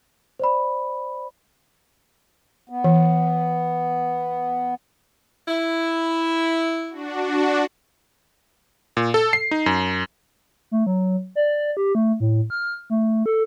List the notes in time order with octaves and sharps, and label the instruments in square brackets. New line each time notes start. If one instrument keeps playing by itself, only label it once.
[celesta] C5 D5 B5
[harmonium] B3
[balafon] E3
[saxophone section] E4
[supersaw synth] D4 F#4
[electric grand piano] A#2
A4
C7
D#4
F#2
[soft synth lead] A3
F#3
D5
G4
A3
A2
F6
A3
A4